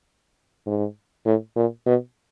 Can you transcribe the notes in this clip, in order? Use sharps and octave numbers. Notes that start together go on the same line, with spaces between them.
G#2
A2
A#2
B2